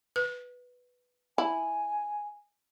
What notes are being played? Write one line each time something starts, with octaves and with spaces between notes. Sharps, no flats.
B4
E4 G#5